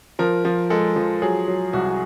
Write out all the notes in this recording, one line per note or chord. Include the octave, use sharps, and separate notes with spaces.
F3 A#4
F3
G#3 A4
F3
F#3 G#4
F#3
C2 F#4